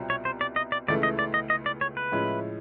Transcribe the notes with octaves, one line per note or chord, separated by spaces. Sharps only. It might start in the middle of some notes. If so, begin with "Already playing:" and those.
Already playing: C2 B2 G3 C4 F4
C#5
C5
D5
D#5
D5
C#2 C#3 E3 A3 D5
D#5
D5
D#5
D#5
D5
C#5
B4
A2 F3 G#3 C#4 E4